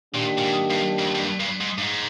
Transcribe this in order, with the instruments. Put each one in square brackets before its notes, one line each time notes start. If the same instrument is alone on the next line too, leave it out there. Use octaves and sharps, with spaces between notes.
[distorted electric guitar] A#2 [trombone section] D#3 A#3 D4 G4
[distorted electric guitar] A#2
G#2
G2
F2
G#2
G2
G2
G#2
G2
G#2